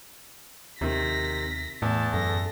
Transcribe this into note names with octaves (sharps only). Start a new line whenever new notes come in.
D#2 C3 D#3 A#6 B6
E2 A2 A5
F#2 A4 A#6